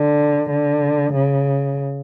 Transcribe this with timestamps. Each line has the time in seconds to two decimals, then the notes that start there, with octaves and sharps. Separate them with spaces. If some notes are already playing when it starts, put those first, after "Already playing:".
Already playing: D3
0.51 D3
1.13 C#3